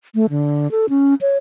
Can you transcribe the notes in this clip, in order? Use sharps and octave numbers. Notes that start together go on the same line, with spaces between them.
A3
D3
A4
C#4
C#5